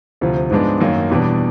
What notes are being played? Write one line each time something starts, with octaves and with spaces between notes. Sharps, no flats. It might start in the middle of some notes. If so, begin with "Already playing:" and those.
D2 C3 F3
G#2 F3 G#3 B3 D4
F#2 D#3 F#3 A#3
E2 B2 G3 B3 D4